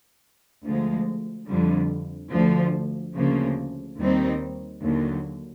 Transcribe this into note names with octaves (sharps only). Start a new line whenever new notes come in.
D2 D3 F3 G#3
F2 D3 G3
D2 D3 F3
D2 C#3 F3 A#3
D#2 D#3 G3 C4 D#4
D#2 D3 F#3